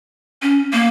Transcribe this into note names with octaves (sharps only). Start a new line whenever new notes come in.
C#4
A#3